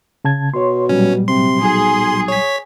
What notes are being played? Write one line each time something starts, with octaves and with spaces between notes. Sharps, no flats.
C#3 A5 G#6
B2 C#5 C6
A#2 F#3 G3 C#4
C3 C6
B1 G#4
C#5 B6